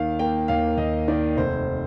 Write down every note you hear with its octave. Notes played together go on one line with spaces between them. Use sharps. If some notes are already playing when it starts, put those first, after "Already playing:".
Already playing: D#2 D#3 F5
A#3 G5
D#2 F5
D#2 D#5
D#3 D5
F1 C5